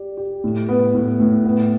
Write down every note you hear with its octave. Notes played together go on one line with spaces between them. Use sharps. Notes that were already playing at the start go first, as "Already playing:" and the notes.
Already playing: G4 D5
G4
A2
B3
A2
A2
B3